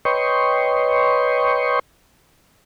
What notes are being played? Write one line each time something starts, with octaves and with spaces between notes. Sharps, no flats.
B4 C#5 D#5 G5 C6 C#6